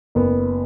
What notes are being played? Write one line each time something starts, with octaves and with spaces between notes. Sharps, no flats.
F#1 B3